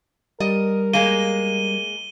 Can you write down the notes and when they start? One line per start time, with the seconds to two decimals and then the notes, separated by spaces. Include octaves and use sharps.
0.40 G3 A#4 D#5
0.93 G#3 A#3 D#7 G7